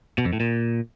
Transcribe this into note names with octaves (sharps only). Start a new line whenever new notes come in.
B2
F2
A2
A#2